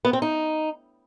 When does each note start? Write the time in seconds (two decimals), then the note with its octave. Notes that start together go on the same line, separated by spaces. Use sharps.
0.05 B3
0.13 C4
0.22 D#4